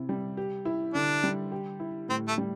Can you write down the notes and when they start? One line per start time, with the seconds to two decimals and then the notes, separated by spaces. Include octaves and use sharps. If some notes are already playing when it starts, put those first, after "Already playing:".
Already playing: C3 E4
0.09 G3
0.37 G4
0.65 E4
0.94 D3 D4
1.24 G3
1.52 G4
1.80 E4
2.09 A2 C4
2.28 A3
2.38 G3